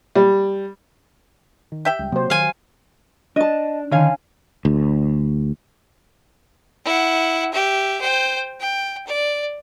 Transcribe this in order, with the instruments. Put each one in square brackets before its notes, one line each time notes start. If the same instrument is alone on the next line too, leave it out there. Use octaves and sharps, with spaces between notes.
[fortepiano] G3
[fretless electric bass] D#3
[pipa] G4 E5 G5
[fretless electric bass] C#2 G3
[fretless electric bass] C3 A#3 C4 [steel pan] F#3 C5
[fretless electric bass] D#3 [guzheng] F5 G#5
[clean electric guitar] D4 [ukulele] D#5 A5
[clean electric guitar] D3 D#3 [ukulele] C#4 F5 G#5
[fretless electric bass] D2
[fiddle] E4 F#5
G4 E5
C5 G5
G5
D5